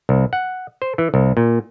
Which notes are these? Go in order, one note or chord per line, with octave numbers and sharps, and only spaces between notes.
C2
F#5
C5
E3
C2
A#2